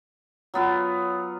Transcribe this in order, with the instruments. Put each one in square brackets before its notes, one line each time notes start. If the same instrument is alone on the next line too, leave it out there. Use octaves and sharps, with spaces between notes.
[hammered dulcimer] F#3 B3 F4